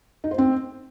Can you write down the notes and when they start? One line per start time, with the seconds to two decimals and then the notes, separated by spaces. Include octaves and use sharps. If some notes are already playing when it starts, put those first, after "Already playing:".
0.24 D#4
0.31 C5
0.38 C4